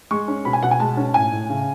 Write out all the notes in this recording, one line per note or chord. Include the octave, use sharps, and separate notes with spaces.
G#3 C#6
C#4
B2 B5
G#5
B2 F#5
G#5
G#3 A5
C#4
A2 G#5
A2
C#3